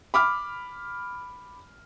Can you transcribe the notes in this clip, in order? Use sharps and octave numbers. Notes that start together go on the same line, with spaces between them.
B5 D6 F6